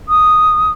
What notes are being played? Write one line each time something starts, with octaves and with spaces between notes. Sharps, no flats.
D#6